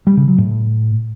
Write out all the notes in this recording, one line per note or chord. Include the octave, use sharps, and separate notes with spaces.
G3
C#3
F#3
A2